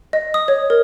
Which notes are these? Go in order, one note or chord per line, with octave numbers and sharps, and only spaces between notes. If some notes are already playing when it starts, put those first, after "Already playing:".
D#5
D#6
C#5
A#4